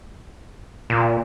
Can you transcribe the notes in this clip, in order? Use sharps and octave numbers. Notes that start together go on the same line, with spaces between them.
A#2